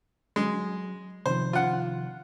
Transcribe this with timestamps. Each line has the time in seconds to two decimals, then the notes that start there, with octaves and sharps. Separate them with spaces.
0.36 F#3 G#3
1.26 C3 D#3 F3 C5
1.53 F4 F#5